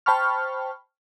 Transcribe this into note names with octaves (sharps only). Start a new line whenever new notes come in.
C5 G5 A5 B5 C#6 F6